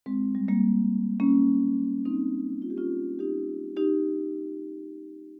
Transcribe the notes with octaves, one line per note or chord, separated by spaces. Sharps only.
G#3 C4
G3
G3 A#3
A#3 C#4
C4 D#4
F4
G4
C#4 F4
D#4 G4
D#4 G4